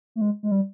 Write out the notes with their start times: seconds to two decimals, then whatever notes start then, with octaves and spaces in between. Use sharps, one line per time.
0.16 A3
0.21 G#3
0.43 G#3
0.51 G3